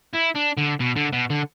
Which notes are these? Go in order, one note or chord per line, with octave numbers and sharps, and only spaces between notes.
E4
D4
D3
B2
D3
B2
D3